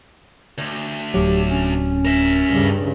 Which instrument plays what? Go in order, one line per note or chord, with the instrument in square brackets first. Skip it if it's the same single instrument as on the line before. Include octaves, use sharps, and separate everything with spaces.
[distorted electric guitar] D2
[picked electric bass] D1 F#3 [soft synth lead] G4
[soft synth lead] C#4
[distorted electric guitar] A#4 E5
[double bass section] G2 C#3